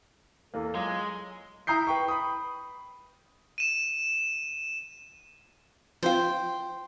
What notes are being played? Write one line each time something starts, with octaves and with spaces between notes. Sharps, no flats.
E2 E3 A#3 A4
F#3 G#3 F4 D6
E4 A#5 D#6 G6 C7
B4 G5 C#6
B5 D#6
D#7 E7
F3 C4 F4 C5 G5